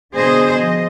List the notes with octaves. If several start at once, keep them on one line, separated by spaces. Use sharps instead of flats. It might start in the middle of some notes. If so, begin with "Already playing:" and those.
B2 D3 G#4 C5 D#5
F3 D#5